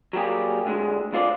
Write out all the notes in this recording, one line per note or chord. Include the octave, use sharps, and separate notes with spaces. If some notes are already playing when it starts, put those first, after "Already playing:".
F#3 G3 A#3 G4 G#4
A2 D3 G#3
B1 G#2 D3 F4 C5 D5